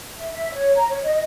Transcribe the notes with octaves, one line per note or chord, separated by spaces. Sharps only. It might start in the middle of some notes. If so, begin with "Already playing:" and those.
E5
E5
C#5
A#5
C#5
D#5